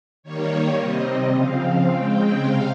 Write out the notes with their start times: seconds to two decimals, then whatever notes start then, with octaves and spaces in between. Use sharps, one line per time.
0.23 D#3 G3 A#3 C#5
0.78 C3 G3 C4 D#5
1.33 C#3 F3 C4 F5
1.88 C#3 G#3 C4 G5
2.43 C3 F5